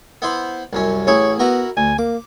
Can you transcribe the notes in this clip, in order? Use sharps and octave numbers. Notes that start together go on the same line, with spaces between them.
B3 E4 C5
C2 F#2 C#4
A1 E4 G#4 C#5
B3 E4 F#4 A#4
D2 G#5
A#3 D6